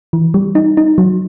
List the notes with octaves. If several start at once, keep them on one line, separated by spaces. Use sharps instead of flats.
E3
G3
D#4
D#4
F#3